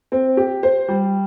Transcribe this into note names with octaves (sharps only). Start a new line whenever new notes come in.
C4
G4
C5
G3